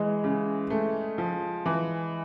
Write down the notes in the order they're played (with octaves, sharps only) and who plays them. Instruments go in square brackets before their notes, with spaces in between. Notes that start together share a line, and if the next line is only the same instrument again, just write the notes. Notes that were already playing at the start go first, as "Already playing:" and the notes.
Already playing: [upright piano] E3 [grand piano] G#3
[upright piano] C#3
A3
F3
E3